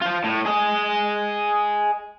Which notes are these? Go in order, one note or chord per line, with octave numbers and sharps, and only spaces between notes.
F4 C5
A2
G#4 D#5